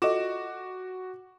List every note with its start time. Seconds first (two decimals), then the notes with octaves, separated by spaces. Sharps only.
0.02 F4 F#4 A4 D#5 D6 E7